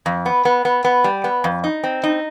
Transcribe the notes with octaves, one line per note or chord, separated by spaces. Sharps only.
F2
B3
B3
B3
B3
G3
B3
F2
D#4
C4
D#4